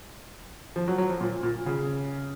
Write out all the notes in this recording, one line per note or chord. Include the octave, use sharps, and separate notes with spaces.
F3
F#3
F#3
F3
A#2
A#2
C#3